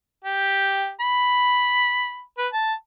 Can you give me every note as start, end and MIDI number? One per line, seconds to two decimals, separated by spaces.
0.24 0.90 67
1.00 2.20 83
2.38 2.47 71
2.53 2.73 81